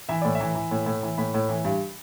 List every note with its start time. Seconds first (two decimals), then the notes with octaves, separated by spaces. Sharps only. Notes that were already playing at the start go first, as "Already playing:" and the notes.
0.09 E3 E5
0.22 A2 D5
0.35 E5
0.40 E3
0.55 E3
0.71 A2
0.86 A2
1.03 E3
1.18 A2 B5
1.34 A2
1.49 E3
1.65 G2